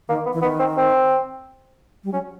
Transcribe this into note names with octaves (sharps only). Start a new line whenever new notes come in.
D#3 A#3
B3
E3
D#3 B3
C4
C4
G3
F#3 C#4